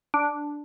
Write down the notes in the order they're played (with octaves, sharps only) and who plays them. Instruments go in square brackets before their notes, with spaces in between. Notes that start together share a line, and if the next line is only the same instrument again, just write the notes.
[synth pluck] D4